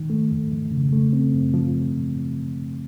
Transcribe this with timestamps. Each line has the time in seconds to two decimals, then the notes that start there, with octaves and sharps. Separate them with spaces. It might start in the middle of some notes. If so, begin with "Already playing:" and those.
Already playing: D#3
0.10 A3
0.31 F2
0.52 F2
0.71 C#3
0.92 A3
1.13 C4
1.34 F#2
1.54 F3